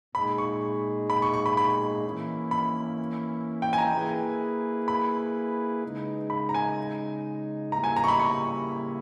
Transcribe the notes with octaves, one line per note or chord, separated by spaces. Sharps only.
A#2 G#3 D#4 G#4 B5
C#6
B5
C#6
C#6
B5
B5
E3 A#3 C#4 E4
B5
G5
G#5
A#5
A#3 E4 G#4 B4
B5
C#3 G#3 D#4
B5
A#5
G#5
C#3 G3 A#3 E4 A#5
G#5
A#5
C#6
B5
C#6